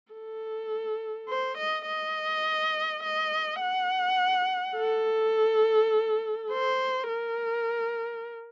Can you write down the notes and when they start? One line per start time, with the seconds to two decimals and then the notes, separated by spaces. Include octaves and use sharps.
0.13 A4
1.29 C5
1.58 D#5
1.87 D#5
3.03 D#5
3.61 F#5
4.76 A4
6.52 C5
7.09 A#4